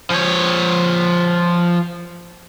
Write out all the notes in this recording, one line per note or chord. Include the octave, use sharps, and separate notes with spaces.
F3 C#5